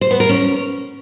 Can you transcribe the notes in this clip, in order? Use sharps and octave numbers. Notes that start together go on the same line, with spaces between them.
C5
B3
A#4
C#4